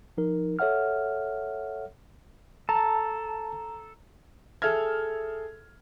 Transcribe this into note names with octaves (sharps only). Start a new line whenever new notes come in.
F3 D#4 A#4
A4 C#5 E5 F#5 F6
A4 A5 A#5
G#4 A4 E5 F6 G#6